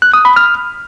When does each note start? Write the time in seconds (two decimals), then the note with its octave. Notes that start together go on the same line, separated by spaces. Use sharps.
0.02 F#6
0.14 D#6
0.25 B5
0.36 F6